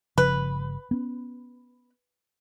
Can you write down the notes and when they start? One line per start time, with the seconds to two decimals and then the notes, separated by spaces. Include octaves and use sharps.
0.18 G1 C#3 F3 B4
0.91 B3 C#4